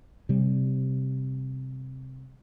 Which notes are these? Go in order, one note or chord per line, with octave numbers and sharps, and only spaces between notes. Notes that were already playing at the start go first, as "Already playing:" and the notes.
C3 G3